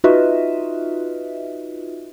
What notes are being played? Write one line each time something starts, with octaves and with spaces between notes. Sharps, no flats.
D#4 F4 F#4 B4 D#5 E5